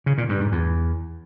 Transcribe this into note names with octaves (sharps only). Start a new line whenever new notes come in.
C#3
A#2
G2
G#2
E2